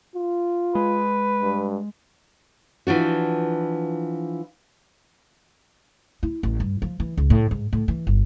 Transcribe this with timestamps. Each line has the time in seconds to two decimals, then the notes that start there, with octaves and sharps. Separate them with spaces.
0.16 F4
0.75 G#3 B4
1.42 G2
2.87 E3 F3 D4 F#4
6.23 E4
6.43 A1
6.60 G2
6.82 F3
7.00 E3
7.17 C#2
7.30 A2
7.51 G#2
7.73 A2
7.88 E3
8.07 G1